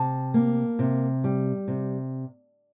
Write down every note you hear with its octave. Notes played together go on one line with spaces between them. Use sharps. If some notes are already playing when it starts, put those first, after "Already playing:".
Already playing: C3 A5
A#3
C3
G3
C3